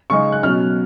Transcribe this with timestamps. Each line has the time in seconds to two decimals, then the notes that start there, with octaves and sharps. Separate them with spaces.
0.10 C#3 G#3 D#4 C#6
0.32 F#6
0.43 B2 F#3 C#4 F6